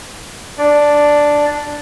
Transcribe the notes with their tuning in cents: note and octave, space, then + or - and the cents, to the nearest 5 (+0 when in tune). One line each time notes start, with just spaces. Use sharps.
D4 +0 D5 +0